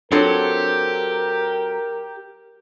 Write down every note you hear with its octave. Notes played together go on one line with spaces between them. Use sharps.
F#3 C4 D4 F4 G4 A4 A#4 C#5